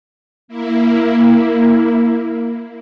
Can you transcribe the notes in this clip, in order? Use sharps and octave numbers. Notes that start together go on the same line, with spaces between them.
A#3 E4